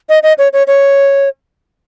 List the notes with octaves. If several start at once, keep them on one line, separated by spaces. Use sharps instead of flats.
D#5
D#5
C#5
C#5
C#5